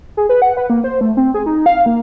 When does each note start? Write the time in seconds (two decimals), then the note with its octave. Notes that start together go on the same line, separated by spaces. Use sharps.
0.17 G#4
0.29 B4
0.42 F#5
0.57 B4
0.70 A#3
0.84 C5
1.01 A3
1.17 C4
1.34 G#4
1.46 D#4
1.66 F5
1.86 A#3